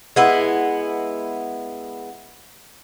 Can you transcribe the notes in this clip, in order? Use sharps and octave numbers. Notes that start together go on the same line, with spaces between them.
G#3 B3 E4